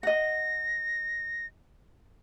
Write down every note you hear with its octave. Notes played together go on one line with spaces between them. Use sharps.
D#5 F#5 A#6